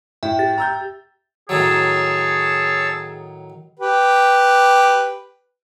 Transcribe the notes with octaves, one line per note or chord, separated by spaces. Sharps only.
A2 E5 G5
G4 A6
A#5 E6 G6
A2 D#3 F#3 G#4 C#5 A5 E6
G4 B4